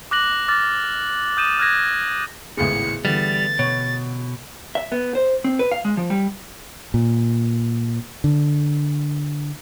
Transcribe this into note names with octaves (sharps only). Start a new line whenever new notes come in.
D6 F#6 A#6 F#7
D6 F6 A6
D#6 G6 D#7 E7
F6 F#6 G#6 A#6
G#1 C#2 A2 B3 E4 G#4 C#7
D3 E3 G3 A3 B3 A6
B2 C#5
E5
B3
C5
C4
B4
F5
G#3
F3
G3
A#2
D3